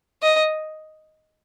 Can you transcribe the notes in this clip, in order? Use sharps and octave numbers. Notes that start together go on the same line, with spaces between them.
D#5